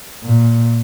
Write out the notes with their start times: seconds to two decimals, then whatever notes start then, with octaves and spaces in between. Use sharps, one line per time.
0.24 A#2